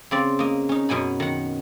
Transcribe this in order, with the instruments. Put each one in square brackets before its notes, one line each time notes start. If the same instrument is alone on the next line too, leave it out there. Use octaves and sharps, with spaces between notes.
[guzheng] C#3 C4 D5
A#3 D#5
C#4 D#4
F#2 B2 F#3 G#5 B5
D#3 F#5